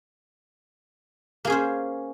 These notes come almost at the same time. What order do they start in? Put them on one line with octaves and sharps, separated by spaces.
A#3 G#4 C#4 C5